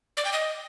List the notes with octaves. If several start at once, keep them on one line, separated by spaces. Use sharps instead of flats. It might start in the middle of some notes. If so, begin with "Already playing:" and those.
D5
G5
D#5